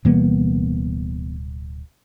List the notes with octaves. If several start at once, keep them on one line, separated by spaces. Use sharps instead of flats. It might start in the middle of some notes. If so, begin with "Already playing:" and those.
D1 B2 E3 G3 A#3 B3